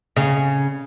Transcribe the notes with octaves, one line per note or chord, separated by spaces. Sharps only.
C#3